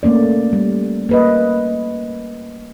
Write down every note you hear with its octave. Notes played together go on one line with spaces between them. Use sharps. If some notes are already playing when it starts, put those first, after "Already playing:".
A3 A#3 C#4 D5
G3
A#3 B4 D#5